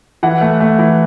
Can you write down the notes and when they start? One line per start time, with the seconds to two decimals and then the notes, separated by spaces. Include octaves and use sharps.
0.23 E3 F#5
0.41 A3
0.60 A3
0.79 E3